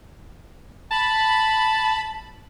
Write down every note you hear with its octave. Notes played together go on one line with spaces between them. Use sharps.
A5 B5